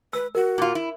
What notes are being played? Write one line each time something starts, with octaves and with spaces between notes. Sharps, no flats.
B4 E6
F#4 A#4
A#2 F4
E4